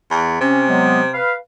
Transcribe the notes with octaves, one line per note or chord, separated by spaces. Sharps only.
E2
C3 C#4
F#3 G#3 B3
B4 F5